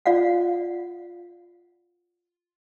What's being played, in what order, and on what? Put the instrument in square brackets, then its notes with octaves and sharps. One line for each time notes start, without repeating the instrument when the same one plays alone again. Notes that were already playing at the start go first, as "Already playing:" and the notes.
[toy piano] F4 D5 F5 F#5